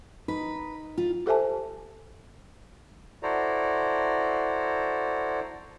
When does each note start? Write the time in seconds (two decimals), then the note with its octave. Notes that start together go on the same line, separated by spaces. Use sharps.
0.28 D#4 B4
0.98 F4
1.26 G4 A4 C5 E5 G#5 A5
3.23 E4 F#4 A4 C5 D5 A#5